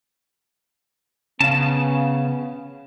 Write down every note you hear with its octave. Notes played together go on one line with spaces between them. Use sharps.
C#3 B3 C#4 F5 A5